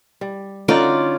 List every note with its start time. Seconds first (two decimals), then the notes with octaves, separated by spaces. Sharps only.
0.21 G3
0.68 D3 C#4 D#4 F4 F#4 D5